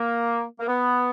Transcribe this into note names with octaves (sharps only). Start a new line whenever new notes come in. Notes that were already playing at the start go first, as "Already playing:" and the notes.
Already playing: A#3
A#3
B3